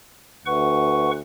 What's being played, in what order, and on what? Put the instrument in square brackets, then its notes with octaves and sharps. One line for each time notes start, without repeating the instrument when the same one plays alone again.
[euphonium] D2 [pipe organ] B4 F#5 C#6